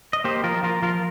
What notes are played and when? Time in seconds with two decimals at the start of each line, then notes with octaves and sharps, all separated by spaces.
0.13 D#5
0.24 A#3 G4 C5
0.44 F3 F4 A#4
0.63 F3 F4 A#4
0.82 F3 F4 A#4